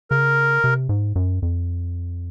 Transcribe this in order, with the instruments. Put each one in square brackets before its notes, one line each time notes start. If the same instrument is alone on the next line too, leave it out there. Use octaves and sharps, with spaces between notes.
[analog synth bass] C#3 [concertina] A#4
[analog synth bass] C3
G#2
F#2
F2